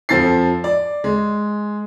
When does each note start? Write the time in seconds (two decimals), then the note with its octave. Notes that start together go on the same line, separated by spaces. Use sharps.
0.09 F2 F3 A4 A6 C7
0.64 D5
1.04 G#3